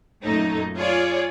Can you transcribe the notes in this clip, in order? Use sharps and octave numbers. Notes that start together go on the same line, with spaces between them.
F#2 A#2 A3 D#4
F4 G#4 C#5 D5